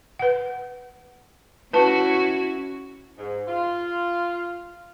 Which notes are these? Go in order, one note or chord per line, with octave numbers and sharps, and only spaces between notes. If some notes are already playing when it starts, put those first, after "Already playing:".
B4 F#5
C#4 E4 F#4 B4 A5
G#2
F4